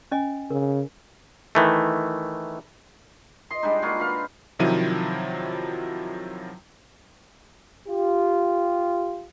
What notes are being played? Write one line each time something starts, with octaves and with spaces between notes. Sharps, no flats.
C#4 D#5 G#5
C#3 A#4
D#3 E3 A3
D#5 C6
G3 G#3 D4 D#4
A#3 F4 F#4 G#4
B4 F5
C3 D#3 F3 F#3 E4 D#7
F4 G4